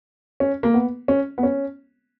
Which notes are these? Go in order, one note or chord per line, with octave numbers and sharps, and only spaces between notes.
C#4
A#3
B3
C#4
B3
C#4